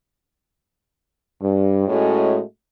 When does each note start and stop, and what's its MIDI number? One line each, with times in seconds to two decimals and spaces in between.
1.41 1.87 43
1.88 2.40 45
1.88 2.40 56
1.88 2.40 57
1.88 2.40 61
1.88 2.40 66
1.88 2.40 75